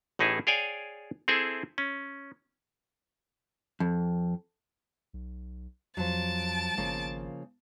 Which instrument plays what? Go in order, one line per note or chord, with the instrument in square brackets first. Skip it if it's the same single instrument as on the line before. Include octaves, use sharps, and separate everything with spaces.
[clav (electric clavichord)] A1 A2 D#4 E4 G#4 E5
G#4 C#5 D5 F5 G5 G#5
C4 E4 G#4 A4 E5
C#4
[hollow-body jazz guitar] F2
[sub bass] B1
[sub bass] F2 [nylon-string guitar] F3 F#3 [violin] A5 D7
[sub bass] G#1 [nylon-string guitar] C#3 F3 A#3